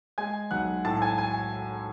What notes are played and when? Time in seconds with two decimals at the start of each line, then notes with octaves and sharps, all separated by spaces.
0.18 G#3 G#5 G#6
0.51 B1 F#5 F#6
0.85 A2 A5 A6
1.02 G#5 G#6
1.18 G#5 G#6